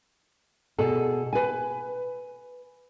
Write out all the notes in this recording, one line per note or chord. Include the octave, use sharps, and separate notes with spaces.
B2 G#4 A4
B4 G#5